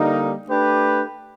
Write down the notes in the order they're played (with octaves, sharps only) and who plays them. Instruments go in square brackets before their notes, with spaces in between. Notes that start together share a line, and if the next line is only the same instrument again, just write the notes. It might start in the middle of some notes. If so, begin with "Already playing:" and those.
Already playing: [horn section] D3 G3 A#3 D#4
A3 D4 G4 B4